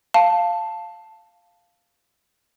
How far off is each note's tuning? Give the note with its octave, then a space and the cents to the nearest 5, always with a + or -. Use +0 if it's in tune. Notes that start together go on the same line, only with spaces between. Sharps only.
F5 +0 A5 +0